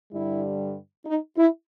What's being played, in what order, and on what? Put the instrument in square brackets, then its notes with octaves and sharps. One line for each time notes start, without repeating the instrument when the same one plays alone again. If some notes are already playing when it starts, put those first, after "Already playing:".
[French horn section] G2 D3 G3 E4
D#4
E4